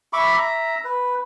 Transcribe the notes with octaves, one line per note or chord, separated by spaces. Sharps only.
E5 B5 C#6 D6
E5 A#5
B4